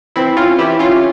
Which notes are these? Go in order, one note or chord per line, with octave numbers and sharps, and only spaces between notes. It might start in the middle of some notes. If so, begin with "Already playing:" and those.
E3 C4 E4
C#4 F4
E3 E4 G4
C#4 F4